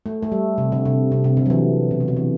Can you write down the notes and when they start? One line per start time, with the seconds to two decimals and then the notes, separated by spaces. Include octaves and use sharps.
0.06 A3
0.23 A3
0.32 G3
0.58 C3
0.72 D3
0.85 C3
1.12 C3
1.24 C3
1.37 D3
1.46 F#3
1.50 E3
1.91 B2
2.00 C3
2.08 D3
2.17 E3